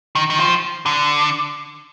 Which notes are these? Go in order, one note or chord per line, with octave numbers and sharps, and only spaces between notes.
D#3
D#3
F3
D3